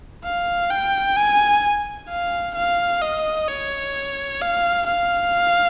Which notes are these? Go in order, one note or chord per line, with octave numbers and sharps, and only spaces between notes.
F5
G5
G#5
F5
F5
D#5
C#5
F5
F5